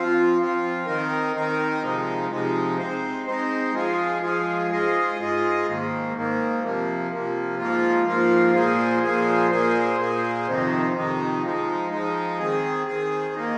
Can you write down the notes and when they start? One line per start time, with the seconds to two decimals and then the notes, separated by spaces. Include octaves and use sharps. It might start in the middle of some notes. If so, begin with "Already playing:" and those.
Already playing: F3 C4 F4
0.38 F3 C4 F4
0.86 D#3 C4 D#4 A#4
1.35 D#3 C4 D#4 A#4
1.82 C3 F3 G#3 D#4
2.30 C3 F3 G#3 D#4
2.78 G#3 C4 D#4 C5
3.27 G#3 C4 D#4 C5
3.74 F3 G#3 F4 G#4
4.23 F3 G#3 F4 G#4
4.71 G#2 G#3 F4 G#4 D#5
5.19 G#2 G#3 F4 G#4 D#5
5.67 G#2 D#3 A#3
6.15 G#2 D#3 A#3
6.63 C3 F3 A#3
7.11 C3 F3 A#3
7.59 G#2 F3 A#3 F4
8.07 G#2 F3 A#3 F4
8.54 A#2 F3 A#3 G#4 C5
9.03 A#2 F3 A#3 G#4 C5
9.50 A#2 A#3 G#4 C5
9.98 A#2 A#3 G#4 C5
10.47 F2 C3 D#3 C4 D#4
10.94 F2 C3 D#3 C4 D#4
11.43 F3 G#3 D#4
11.90 F3 G#3 D#4
12.39 D#3 C4 G#4
12.87 D#3 C4 G#4
13.35 D#3 A#3 D#4